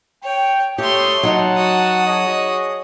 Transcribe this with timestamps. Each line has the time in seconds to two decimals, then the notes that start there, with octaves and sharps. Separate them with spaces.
0.24 C#5 G5
0.78 G3 A3 G4 C#5 C6 D#6
1.23 F#3 D#4 F#5 A5
1.57 F#4 D#6
2.06 G#4 C#5 D#5